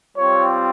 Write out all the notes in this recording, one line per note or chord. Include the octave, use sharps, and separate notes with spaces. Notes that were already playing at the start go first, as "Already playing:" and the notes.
G3 C4 F4 C#5